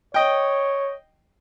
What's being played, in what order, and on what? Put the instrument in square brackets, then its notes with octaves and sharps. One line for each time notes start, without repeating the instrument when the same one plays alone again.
[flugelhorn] C#5 [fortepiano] D#5 G5